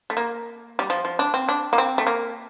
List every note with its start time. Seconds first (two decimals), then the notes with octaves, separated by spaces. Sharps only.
0.10 A3
0.17 A#3
0.79 G3
0.90 F3
1.05 F3
1.19 D4
1.34 C4
1.49 D4
1.73 A#3
1.78 C4
1.98 A3
2.07 A#3